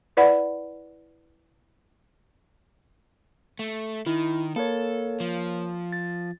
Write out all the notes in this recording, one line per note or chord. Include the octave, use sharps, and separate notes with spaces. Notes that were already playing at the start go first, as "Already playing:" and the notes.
E4 B4 D5 F#5 B5
A3
D#3 E4
A#3 A4 A#4 C#5
F3
A6